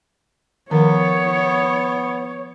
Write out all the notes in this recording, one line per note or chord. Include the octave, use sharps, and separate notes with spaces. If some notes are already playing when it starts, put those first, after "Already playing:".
D#3 F3 B3 A#4 C#5